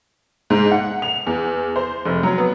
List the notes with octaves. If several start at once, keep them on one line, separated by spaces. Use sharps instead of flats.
G#2
F#5
F7
E2
C5
F1
F#3
B3